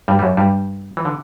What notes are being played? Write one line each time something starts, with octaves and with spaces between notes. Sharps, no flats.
G2 G3
G3
F#2 F#3
G2 G3
E3
D3